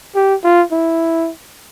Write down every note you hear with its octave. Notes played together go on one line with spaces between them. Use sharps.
G4
F4
E4